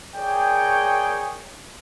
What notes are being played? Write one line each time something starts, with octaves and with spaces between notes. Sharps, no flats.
G#4 A#4 C#5 D5 G5